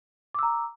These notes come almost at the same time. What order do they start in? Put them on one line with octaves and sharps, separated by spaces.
D6 E6 A#5